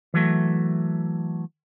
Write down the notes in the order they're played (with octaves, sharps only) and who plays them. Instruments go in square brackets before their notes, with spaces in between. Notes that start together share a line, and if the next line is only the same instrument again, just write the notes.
[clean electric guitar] E3 F#3 A3